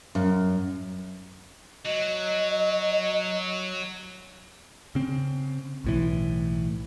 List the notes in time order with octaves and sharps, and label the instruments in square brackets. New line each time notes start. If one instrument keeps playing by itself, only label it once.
[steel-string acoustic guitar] F#2
[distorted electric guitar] F#3 [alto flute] D#5
[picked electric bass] C#3 C4
B1 A2 E3